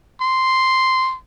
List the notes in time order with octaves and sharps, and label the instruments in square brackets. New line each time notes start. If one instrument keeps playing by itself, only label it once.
[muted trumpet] C6